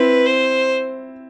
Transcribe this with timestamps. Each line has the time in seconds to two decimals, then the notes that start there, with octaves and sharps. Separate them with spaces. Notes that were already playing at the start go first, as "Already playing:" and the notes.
Already playing: C4 E4 B4
0.26 C5